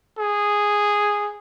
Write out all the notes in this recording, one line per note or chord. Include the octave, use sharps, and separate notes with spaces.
G#4